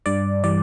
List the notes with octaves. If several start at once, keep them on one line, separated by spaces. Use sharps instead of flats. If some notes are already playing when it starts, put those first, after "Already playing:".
G2 D5
E3 G3 D5